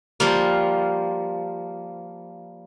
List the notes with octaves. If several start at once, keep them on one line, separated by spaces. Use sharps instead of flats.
F3 G3 A#3